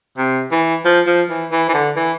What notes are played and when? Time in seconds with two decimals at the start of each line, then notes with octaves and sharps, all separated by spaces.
0.18 C3
0.51 E3
0.85 F3
1.06 F3
1.30 E3
1.52 E3
1.69 E3
1.74 D3
1.96 E3